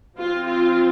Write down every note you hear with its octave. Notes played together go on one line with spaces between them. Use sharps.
F3 C4 F4
F4